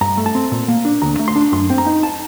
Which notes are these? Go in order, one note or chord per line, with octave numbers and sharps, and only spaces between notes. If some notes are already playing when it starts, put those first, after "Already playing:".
G2 A#5
A3
A5
C4
A#2
A#3
D4
D2 A#5
A3
C6
D4
F#2 C6
C4
A#5
D#4
A5